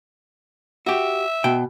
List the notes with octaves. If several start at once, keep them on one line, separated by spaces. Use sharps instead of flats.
F#4 G4 E5
B2 G5